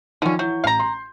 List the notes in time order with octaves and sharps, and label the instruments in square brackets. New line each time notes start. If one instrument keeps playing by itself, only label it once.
[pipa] D3 C#4 [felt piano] D#3 F3
[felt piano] E3 G6 [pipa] F#3
[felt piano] A1 [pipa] F5 A#5
[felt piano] C6